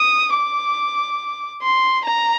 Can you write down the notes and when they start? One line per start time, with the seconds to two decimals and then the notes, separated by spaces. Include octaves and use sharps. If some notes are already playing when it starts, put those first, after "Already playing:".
Already playing: D#6
0.33 D6
1.62 C6
2.05 A#5